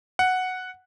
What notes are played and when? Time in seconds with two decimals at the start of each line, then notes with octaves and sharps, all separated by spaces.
0.19 F#5